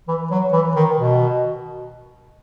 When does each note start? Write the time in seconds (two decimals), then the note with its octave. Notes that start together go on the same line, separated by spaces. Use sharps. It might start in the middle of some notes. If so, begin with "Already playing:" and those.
0.08 E3
0.31 F#3
0.53 E3
0.76 D#3
0.99 B2